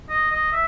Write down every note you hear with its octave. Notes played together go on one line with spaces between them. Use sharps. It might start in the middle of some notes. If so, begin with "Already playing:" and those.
D#5
D#5
E5